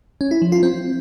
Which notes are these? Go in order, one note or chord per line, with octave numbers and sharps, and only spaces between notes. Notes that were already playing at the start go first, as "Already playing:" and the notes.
C#4
E4
F3
F4
C4